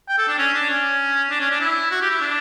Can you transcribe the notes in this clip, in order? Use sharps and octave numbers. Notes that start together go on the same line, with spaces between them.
G5
A4
D4
C#4
D4
C#4
D4
C#4
D4
E4
F#4
G4
E4
D4